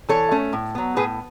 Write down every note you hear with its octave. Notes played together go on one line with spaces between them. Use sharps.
E3 A4 C#5
A3 C#4
A2
F#3 B3
A2 G#4 B4